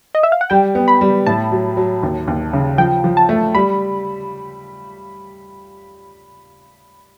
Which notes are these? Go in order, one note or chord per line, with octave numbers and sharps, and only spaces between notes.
D#5
E5
F5
F#5
G3 G5
B3
B5
G3
A2 A5
F#3
F#3
D#2
D#2
C#3
F3 G5
F3
A5
A3
G3 B5